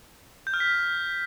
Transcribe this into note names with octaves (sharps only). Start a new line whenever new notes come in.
G6
F6
B6